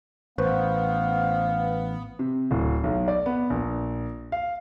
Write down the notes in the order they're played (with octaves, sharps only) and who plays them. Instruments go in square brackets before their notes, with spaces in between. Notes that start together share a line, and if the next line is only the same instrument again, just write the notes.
[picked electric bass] A1 [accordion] B3 [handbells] B4 C5 C#6 [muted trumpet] F5
[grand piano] C3
D1
B1
D5
B3
A#1
F5